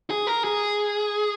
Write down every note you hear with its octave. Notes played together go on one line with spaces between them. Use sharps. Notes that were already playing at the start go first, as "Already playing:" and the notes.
G#4
A#4
G#4